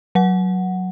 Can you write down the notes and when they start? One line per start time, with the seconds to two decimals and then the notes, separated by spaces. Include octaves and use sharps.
0.15 F#3 F#5